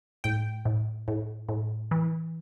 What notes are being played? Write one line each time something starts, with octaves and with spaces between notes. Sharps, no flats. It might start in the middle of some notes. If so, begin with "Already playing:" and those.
A2 G5
A2
A2
A2
E3